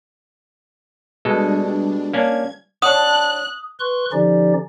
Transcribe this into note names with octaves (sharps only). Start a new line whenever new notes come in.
B2 G3 G#3 D4 A4
A#3 C#4 D4 G#6
D4 C#5 F#5 D#6 F#6
B4 C6 C#6 F#6
D3 F3 C#4 D#4 G4 D5